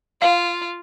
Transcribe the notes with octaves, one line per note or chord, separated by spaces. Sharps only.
F4 F5